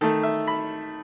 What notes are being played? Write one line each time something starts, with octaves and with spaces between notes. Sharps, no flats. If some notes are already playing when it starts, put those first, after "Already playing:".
D#3 A3 A4
E5
B5